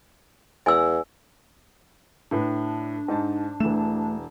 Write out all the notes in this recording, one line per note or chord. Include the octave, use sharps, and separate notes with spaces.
E2 G#5 E6
A2 D4 B4
G#2 D#4 A5
E1 E3 A3 E7